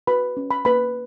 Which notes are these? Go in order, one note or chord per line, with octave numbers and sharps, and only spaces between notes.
F#4 B4 B5
C#4
B5
A#3 B4 B5